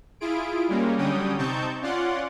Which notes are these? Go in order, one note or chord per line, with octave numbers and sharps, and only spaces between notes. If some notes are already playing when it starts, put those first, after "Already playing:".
E4 F4 G#4 D7
G3 G#3 A#3 C#4
D3 F#3 G3 C#4 G5 D#6
C3 C4 D#4 A5 C#6 G6
C#4 F4 D5 F#5 C6